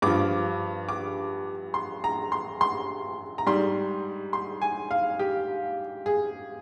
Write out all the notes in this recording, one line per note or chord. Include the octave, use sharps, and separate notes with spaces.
G2 F3 D6
D6
C6
A#5
C6
C6
A#5
G#2 G3 C6
C6
G#5
F5
G4
G#4